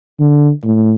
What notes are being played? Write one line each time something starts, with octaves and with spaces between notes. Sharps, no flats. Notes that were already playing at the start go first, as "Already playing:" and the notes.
D3
A2